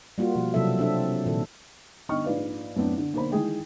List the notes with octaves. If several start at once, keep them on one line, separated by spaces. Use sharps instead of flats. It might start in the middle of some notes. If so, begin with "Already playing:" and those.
G3 A#3 F4 F#4
B2 F3 A#3
C3 F#3 C4 E4 A4 E5
C4 D4 A4 E5
A#2 D#3 A4
G1 D#4 D#5 G5 C#6 F6
A#1 G#2 F4 B4 D5 F5
F#2 A2 B3 C4 D4
D3
B1 D3 A#3 C5 B5
D#3 E3 G#3 G#4 G5